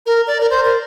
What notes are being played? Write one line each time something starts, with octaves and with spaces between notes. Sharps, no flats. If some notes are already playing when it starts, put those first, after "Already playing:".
A#4
D5
A#4
C5
A#4